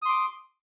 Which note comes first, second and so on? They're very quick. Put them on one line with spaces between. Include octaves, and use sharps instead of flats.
D#6 C6 D6